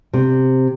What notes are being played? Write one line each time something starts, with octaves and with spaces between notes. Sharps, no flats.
C3